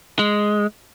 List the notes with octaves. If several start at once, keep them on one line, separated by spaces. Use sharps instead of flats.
G#3